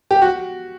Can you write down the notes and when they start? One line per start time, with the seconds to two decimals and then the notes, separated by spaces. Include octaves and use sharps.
0.11 G4
0.22 F#4